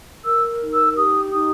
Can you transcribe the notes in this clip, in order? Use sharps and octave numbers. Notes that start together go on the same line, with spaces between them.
A#4 E6
D#4
E6
G4 D#6
D#4 D#6